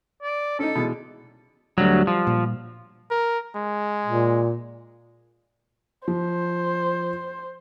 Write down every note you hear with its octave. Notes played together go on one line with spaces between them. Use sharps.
D5
C#4 D#4 A4
B2 E3 G#3
D2 F#3 G3
F3
A#2
A#4
G#3
A#2
F3 C5